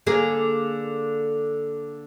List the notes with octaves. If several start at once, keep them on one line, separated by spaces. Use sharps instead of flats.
D3 A#3 G#4